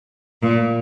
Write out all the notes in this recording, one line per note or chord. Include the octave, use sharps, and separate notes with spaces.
A#2